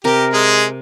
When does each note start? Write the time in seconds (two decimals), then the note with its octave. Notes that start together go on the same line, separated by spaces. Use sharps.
0.04 C3 G4 A#4
0.33 G#3 G#4